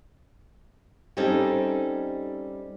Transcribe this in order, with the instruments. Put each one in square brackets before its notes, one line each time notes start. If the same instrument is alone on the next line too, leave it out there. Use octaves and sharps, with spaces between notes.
[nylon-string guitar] G3 C4 C#4 D#4 A4